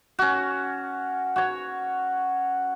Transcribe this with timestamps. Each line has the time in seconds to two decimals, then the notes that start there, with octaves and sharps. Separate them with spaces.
0.19 C#4 F#4
1.36 F#4 C#5